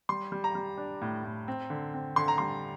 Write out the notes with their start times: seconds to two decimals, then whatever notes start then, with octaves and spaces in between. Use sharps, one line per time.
0.09 G3 C6
0.32 G3
0.44 A#5
0.55 G3
0.77 D4
1.02 A2
1.24 A2
1.48 C4
1.70 D3
1.94 C4
2.16 D3 C6
2.28 A#5
2.38 G3 C6